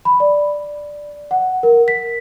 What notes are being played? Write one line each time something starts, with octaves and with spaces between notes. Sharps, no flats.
B5
D5
F#5
A#4
B6